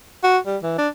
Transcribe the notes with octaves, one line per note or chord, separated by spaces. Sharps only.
F#4
G3
E3
D4